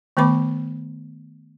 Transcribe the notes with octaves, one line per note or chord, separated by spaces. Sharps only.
D#3 A3 B3 B4 B5 D6